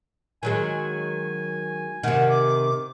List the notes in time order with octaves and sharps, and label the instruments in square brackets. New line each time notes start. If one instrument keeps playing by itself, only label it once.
[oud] D#3 F#3 G#3 [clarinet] G#5
[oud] C3 D#3 [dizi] F#5
[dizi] D6